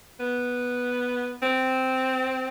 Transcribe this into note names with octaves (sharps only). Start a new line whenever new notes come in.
B3
C4